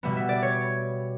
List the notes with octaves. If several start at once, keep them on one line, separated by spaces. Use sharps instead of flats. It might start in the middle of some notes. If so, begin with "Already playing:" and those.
B2 G3 B3 E5
E5
D5
C#5